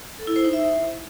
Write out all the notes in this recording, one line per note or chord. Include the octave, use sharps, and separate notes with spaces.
A4
E4
C5
D#4
E5